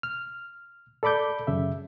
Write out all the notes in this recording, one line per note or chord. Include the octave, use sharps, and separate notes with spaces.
F6
A4 D5 B5 D6 G6
F#2 C#3 E5